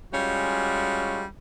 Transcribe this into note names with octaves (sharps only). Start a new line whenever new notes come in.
G3 G#3 C#4 F4 F#4